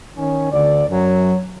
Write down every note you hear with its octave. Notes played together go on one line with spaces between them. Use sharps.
D#3 C#4
D2 D3 D5
F#2 F#3